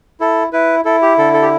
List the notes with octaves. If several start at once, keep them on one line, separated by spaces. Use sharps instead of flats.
E4 A4
E4 B4
E4 A4
G4
D3 A4
A4
G4